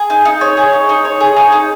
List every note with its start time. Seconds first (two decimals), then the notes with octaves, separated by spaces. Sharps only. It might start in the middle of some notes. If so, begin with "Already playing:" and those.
Already playing: G#4
0.10 D#4
0.25 D#4
0.41 C#5
0.57 G#4
0.73 D#4
0.89 D#4
1.05 C#5
1.20 G#4
1.36 D#4
1.52 D#4